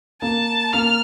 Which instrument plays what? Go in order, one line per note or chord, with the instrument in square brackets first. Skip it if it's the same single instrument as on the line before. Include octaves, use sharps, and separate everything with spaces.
[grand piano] A#3 [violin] A5
[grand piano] A#3 [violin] F6